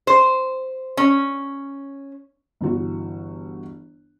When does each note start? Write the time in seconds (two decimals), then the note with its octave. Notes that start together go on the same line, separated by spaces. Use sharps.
0.07 C5
0.97 C#4
2.61 G1 E3 F#4